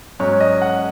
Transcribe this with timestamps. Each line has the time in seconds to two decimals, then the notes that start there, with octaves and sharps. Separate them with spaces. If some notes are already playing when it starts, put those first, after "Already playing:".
0.19 G#2 F#3 C#4 C#5
0.40 D#5
0.62 F#5